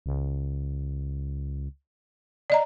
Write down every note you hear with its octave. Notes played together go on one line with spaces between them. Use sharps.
C#2
D5 D#5 A#5